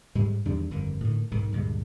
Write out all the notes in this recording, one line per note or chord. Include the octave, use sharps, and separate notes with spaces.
G#2 G3 G#3
E2 D#3 G3 D4
G1 F2 D#3
A2 D3 D#3
B1 G#2 D#3
D2 G2 A#2 G#3